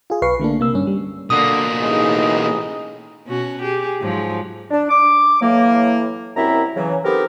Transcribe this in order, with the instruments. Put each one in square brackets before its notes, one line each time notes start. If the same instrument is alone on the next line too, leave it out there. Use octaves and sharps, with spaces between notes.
[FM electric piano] F4 G#4
B1 B4 F5 C#6 C7
D3 A3 A#3 D4
C3 A#3 E6
G2 C#4
G3
[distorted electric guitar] B2 A#3 [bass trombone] D3 [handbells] D#6
[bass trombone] A1 [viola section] D#4 G#4 D#5
[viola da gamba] B2 C#4 F#4
G4 G#4
G#2 F3 F#3
[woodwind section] D4
D6
A2 E3 F#3 A#3
C2 F#2 C4 E4 E5 A#5
C#3 E3 F#3
B3 C4 D#4 G4 A4 A#4